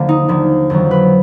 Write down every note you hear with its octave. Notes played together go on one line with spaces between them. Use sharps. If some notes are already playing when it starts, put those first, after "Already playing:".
Already playing: D#2 D3 F3 A#3
D#4
D#2 D3 F3 A#3
F2 D#3 F#3
B4